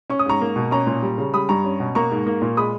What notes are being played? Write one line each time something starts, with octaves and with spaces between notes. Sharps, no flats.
C#4 C#6
D#6
G#2 A#5 C#6
A#3
B2
C#4 A#5 C#6
A#2
G3
C#3
G3 B5 D#6
G2 A#5 C#6
C#4
B2
A#3 A#5 C#6
G#2
A#3
A#2
G#3 B5 D#6